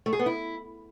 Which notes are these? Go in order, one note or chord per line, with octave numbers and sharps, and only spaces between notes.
A3
G#4
B3
E4